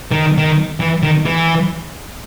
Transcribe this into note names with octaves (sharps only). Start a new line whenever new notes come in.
D#3
D#3
E3
D#3
E3